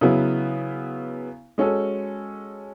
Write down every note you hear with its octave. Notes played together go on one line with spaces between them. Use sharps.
C#3 F#3 B3 E4
G#3 C#4 F#4 A4